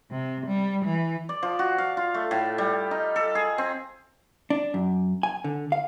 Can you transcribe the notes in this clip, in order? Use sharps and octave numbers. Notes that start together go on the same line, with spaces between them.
C3
G3
E3
D5
F3
F#4
F5
F4
A3
A2
G3
D#4
A4
G#4
C4
D4
F#2
G#5
D3
F5